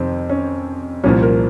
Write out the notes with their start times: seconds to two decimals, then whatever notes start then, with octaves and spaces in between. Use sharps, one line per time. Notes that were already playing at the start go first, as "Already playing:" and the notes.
Already playing: F2 C3 D#3 C4
0.29 C#4
1.04 C2 A#2 F3 C#4
1.23 A#4